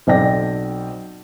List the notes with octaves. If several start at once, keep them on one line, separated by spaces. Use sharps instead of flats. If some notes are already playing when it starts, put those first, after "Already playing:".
B1 C4 D5 G5 A#6